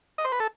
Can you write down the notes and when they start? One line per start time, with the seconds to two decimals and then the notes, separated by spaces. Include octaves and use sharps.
0.18 D#5
0.25 C5
0.32 B4
0.40 A4